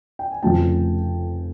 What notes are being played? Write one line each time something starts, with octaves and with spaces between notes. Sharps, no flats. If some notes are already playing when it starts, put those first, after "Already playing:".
G5
G#5
F1 F2 C#3 F3 A3 G5 A5